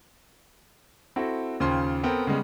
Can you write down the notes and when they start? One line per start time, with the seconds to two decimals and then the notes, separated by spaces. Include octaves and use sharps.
1.16 C4 E4 F#4 A4
1.60 D#2 C#3 F4 C5 G5 C6
2.03 B3 C4 A4 A#4 G5
2.27 C#3 G3 G#3 B3